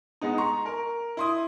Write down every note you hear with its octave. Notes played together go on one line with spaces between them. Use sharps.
G#3 B3 D#4
A#5 C6 C#6
A#4
E4 C6 D#6